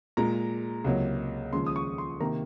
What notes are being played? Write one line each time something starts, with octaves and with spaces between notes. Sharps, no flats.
A#2 G#3 A#5
C#2 C3 F#3 A#3
D#2 C#3 F3 G#3 C6
D#6
C#6
C6
C3 D#3 A#3 A#5